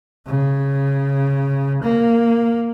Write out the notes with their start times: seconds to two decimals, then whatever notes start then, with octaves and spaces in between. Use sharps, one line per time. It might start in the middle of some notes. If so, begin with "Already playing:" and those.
0.26 C#3
1.83 A#3